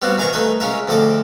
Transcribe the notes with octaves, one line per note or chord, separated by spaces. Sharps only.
G3 B3 C4 F4 F#4
D#3 E3 F5 G#5 A#5 C#6
A3 D#4 B4 G#5 D#6
G#3 C#4 F4 A#4 E5
D2 F3 C4 A4 D#5 D6